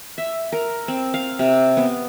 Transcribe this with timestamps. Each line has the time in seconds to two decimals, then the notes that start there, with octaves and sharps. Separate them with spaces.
0.18 E5
0.52 A#4
0.88 C4
1.14 F5
1.39 C3
1.77 B3